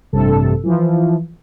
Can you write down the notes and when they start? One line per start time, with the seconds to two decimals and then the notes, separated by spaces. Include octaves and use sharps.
0.12 A1 G2 C3 A4
0.63 E3 F3